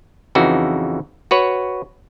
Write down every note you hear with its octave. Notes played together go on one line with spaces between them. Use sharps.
F2 C#3 E3 D#4 F#4
F#4 B4 C#5